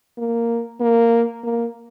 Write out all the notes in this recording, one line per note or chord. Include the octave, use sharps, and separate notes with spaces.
A#3
A#3
A#3